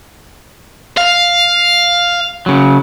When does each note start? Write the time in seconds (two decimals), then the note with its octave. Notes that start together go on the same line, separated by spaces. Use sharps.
0.97 F5
2.46 C#3 F#3